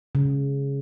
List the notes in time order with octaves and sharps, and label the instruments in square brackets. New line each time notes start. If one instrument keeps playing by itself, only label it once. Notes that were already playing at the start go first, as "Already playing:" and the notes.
[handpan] C#3